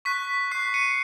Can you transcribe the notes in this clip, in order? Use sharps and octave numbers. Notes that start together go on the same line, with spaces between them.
C#6 F#6 B6
C#6 F#6 C7
C#7 D#7